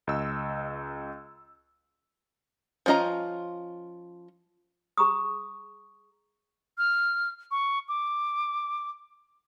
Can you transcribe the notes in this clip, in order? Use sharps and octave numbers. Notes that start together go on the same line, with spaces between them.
C#2 D#5 E6
F3 C#4 F4 D#5 A#5
G#4 A#5 C#6 D#6
F6
C#6
D6